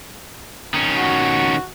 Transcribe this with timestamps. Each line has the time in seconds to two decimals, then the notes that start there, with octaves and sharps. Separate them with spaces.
0.74 D#3 C#4
0.96 F#4